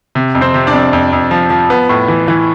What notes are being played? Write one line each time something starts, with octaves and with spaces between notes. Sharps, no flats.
C3
F2
C4 C5
C3
D4 D5
F2
F2
F2
F3
F3
B3
A2
E3
E3